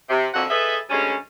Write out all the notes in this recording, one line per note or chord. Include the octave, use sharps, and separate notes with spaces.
C3
F2 A#2 D3 F#4 E5 F#5
G#4 A4 B4 D#5 E5
D2 G3 G#3 C#4